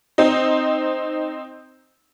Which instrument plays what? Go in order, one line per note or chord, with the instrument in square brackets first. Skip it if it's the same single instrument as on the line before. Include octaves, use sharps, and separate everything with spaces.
[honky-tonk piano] C4 D#4